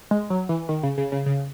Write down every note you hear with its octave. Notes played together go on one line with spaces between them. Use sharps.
G#3
F#3
E3
D#3
C#3
C#3
C#3
C#3